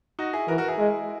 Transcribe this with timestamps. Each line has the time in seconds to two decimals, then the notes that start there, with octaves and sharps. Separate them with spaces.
0.19 D#4 F#4
0.33 E4 G#4
0.48 E3 F#4 A#4
0.58 F#4 A#4
0.68 E4 G#4
0.79 G#3